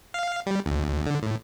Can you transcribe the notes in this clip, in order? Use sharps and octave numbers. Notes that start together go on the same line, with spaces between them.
F5
G3
D2
D3
A2